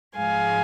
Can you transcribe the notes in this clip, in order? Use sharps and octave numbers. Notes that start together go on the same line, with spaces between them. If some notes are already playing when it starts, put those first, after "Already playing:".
G#2 F3 G#3 F5 G#5